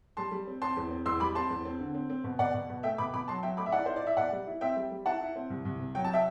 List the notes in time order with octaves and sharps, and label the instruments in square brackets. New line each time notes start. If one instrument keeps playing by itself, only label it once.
[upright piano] G3 A5 C6
G3
C4
C4 A5 C6
E2
C4
E2 C6 E6
G3 B5 D6
C4 A5 C6
E2
C4
D3
C4
C4
B2
B2 D5 F#5
B2
B2
A3 E5 G5
B2 B5 D6
B2 B5 D6
F#3 A5 C6
F#3 E5 G5
A3 B5 D6
E5
E4 D5 F#5
E4 C5
D5
E4 E5
B2 D5 F#5
G3
E4
C4 E5 G5
G3
G3
E4 F#5 A5
E4
C4
C2
C2
C3
F#3 G5
A5
E5 G5